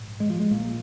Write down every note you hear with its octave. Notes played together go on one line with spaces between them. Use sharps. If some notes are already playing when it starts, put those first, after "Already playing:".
Already playing: A#1 G#2
G#3
F3
G#3
A#1 A#2 A#3